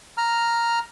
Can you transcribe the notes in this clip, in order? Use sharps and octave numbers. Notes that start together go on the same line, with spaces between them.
A#5 F6